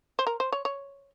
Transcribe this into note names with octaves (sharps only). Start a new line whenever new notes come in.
C5
A#4
C5
C#5
C#5